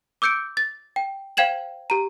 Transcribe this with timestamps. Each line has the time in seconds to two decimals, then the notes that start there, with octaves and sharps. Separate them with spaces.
0.22 D6 E6 G6 C#7 D7
0.57 A6
0.96 G5
1.37 C5 F5 G5 G#6 E7 F#7
1.90 G4 A#5